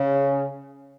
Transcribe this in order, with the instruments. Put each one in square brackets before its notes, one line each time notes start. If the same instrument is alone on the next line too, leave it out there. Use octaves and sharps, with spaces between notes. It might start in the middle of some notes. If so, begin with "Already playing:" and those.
Already playing: [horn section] C#3